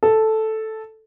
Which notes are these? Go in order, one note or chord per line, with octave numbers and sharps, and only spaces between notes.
A4